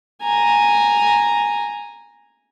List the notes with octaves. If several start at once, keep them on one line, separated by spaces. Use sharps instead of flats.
G#5 A#5